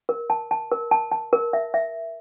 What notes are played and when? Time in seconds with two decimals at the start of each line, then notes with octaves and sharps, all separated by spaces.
0.09 A#4
0.30 A5
0.51 A5
0.71 A#4
0.91 A5
1.12 A5
1.33 A#4
1.53 E5
1.74 E5